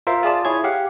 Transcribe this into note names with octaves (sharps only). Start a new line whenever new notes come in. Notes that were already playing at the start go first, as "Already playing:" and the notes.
F4 A#4 C5 E5 F5
F4 G#4 D5 A5
E4 G#4 C#5 G#6
G4 F5 F#5